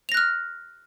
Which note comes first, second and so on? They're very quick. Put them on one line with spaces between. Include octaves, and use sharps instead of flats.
F7 A#6 F#6 F6